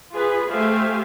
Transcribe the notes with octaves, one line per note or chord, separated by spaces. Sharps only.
F4 G#4 B4
A3 G4 C5 E5 F5 G#5